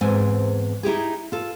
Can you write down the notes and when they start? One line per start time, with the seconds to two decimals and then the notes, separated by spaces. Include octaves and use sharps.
0.01 E2 G#2 C4 G#5
0.83 D#4 E4 G4 G#4
1.32 F4 A4